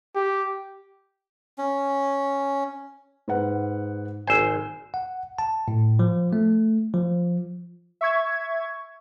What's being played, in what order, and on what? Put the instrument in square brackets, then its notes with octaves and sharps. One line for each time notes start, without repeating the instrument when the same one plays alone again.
[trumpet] G4
[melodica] C#4
[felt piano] G#2 B4 F#5
[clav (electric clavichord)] G#1 C5 [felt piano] G#5 E6
[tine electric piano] F#5
A5
A2
F3
A3
F3
[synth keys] E5 C#6 G#6